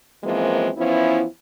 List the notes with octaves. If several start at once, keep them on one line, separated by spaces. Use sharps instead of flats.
F#2 E3 F3 G#3 A#3 C4
E3 F3 B3 C#4 E4